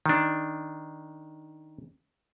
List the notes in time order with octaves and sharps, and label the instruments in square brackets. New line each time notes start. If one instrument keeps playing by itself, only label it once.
[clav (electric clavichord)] D#3 D4